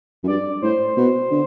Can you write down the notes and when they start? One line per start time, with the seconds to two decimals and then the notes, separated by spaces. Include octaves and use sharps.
0.23 F#2
0.27 G2 D5
0.62 A2 C5
0.97 B2
1.31 D3